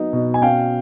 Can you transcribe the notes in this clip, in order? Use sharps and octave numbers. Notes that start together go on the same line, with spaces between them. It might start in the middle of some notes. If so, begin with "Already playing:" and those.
Already playing: F#3 B3 D#4
B2
G#5
C#4 F5 G5